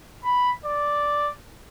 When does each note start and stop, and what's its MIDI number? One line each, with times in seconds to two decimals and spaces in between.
0.24 0.50 83
0.65 1.30 74